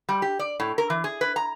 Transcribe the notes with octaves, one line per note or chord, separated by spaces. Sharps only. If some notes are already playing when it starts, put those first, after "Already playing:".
G3
G4
D5
A2
A#4
E3
G#4
B4
A#5